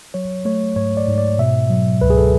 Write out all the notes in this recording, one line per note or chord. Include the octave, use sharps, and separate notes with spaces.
F#3 C#5
A3 C#5
G#2 C#5
D5
G#2
D5
B2 E5
F#3
C#2 B4
G#4
A4